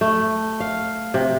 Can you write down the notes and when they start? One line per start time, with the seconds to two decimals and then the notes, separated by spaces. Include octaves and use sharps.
0.01 A3
0.60 F5
1.14 C3